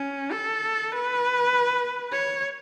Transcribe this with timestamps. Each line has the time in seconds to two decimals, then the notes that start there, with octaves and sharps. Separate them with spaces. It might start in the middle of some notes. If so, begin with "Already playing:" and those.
Already playing: C#4
0.32 A4
0.92 B4
2.12 C#5